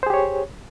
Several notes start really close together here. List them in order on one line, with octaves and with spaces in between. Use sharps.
C5 G#4 G4 C#5